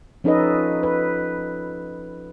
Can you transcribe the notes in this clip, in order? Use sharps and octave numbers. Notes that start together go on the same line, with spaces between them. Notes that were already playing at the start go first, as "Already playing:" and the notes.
F3 C#4 D#4 A4 B4 D#5
B4